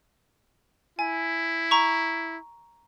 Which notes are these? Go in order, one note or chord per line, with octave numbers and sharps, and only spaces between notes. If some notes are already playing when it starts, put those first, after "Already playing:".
E4 G#5
A#5 C#6